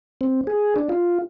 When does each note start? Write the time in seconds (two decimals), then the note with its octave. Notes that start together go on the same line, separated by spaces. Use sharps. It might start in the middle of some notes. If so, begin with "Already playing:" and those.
0.21 C4
0.47 G#4
0.76 D4
0.89 F4